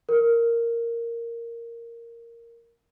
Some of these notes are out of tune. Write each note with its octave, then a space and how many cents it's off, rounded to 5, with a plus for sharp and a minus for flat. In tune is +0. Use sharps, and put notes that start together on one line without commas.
A#4 -5